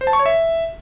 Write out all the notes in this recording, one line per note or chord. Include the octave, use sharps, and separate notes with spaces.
C5
A5
C#6
C#5
E5